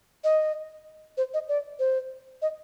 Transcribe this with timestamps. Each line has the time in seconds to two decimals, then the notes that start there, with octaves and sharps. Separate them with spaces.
0.24 D#5
1.17 C5
1.34 D#5
1.49 D5
1.79 C5
2.42 D#5